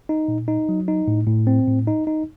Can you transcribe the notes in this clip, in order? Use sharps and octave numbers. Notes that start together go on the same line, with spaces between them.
D#4
A#2
D#4
F#3
D#4
A2
A2
C4
A2
D#4
D#4